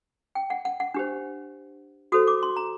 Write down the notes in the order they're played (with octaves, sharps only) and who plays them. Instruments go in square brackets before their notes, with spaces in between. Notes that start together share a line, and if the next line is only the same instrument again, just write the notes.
[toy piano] G5
F#5
F#5
F#5
D4 G4 C5
F#4 A4 C5 D#6
D6
C6
A#5